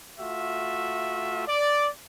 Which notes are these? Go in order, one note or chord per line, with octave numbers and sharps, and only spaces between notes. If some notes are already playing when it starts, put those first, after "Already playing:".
A3 F4 F#4 E5
D5